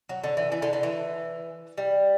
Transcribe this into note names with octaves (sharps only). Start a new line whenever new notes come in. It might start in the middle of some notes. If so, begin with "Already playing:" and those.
F#3
D3
E3
E3
D3
D3
E3
G3